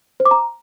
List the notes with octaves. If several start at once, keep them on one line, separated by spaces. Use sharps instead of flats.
C5
D6
A#5